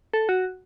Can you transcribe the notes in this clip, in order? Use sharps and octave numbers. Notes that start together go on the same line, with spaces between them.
A4
F#4